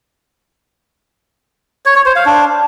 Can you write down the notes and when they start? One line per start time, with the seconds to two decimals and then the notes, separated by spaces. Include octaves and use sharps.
1.86 C#5
1.96 C#5
2.06 C5
2.16 F5
2.26 D4